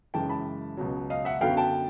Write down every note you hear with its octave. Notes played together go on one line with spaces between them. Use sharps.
F#2 C#3 E3 G#3 G5 A5
A5 B5
C#2 B2 F#3
D#5 F5
E5 F#5
F#2 D3 F#3 B3 F5 G5
G5 A5